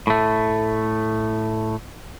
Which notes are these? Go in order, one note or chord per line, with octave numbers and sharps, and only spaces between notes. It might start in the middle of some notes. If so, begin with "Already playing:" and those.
A2 A3